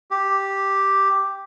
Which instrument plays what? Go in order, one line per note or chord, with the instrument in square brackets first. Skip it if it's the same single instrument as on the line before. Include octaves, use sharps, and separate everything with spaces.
[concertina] G4